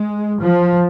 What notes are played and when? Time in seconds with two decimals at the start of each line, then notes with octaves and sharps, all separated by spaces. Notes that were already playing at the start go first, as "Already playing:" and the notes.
Already playing: G#3
0.40 F3